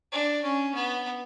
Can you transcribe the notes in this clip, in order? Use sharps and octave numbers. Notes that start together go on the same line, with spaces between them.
D4
C#4
B3